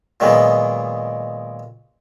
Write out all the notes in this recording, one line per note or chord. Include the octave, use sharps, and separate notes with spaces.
A#2 D#3 F#3 G#3 B3